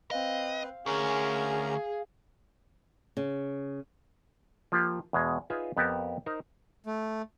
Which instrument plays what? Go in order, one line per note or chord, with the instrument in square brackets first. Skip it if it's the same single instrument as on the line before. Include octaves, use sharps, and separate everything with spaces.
[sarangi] C4 [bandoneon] B4 [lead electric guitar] D#5 [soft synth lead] F5
[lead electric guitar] D2 [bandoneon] C#4 A#4 A#5 [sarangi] G#4
[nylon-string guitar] C#3
[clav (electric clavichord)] F3 A#3 F4 G4
E2 B2 G#3
D#4 F4 G#4 B4 C#5 E5
F2 B3 G4 A#4 F#5 A5
D#4 A#4 C5
[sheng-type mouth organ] A3